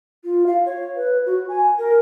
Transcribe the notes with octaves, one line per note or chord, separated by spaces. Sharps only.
F4
F5
C#5
B4
F#4
G#5
A#4